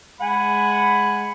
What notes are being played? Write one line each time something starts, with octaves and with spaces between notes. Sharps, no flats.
G#3 F#5 G#5 B5